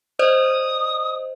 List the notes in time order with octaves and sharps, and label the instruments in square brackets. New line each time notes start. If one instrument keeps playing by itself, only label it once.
[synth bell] C5 D5 D#5 [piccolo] D#6